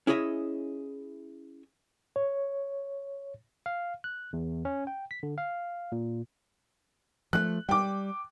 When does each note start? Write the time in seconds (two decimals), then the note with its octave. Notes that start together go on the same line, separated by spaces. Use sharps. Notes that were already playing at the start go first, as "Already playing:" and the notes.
0.07 C#4 E4 G#4 C#5 D#5 E5
2.16 C#5
3.66 F5
4.04 F#6
4.33 E2
4.65 C#4
4.87 G5
5.11 B6
5.23 D3
5.38 F5
5.92 A#2
7.33 F3 G3 A3 F#6
7.69 G3 G5 D6